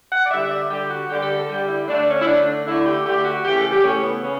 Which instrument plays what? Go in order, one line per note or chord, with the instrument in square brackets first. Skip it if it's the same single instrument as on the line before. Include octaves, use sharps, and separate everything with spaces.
[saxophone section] F#5
D5
D3 G3 E5
D5
D3 G3 G4
F#4
D3 G3 G4
A4
A4
D3 G3 G4
E4
D3 A3 D4
C#4
E4
D3 A3 D4
D4
D3 A3 E4
G4
D3 A3 G4
F#4
C#3 E3 A3 G4
A4
G4
C#3 E3 A3 C#4
B3
C#3 C#4